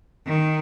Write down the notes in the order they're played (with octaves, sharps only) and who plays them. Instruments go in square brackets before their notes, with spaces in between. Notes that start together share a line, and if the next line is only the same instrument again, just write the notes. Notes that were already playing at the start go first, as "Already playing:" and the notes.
[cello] D#3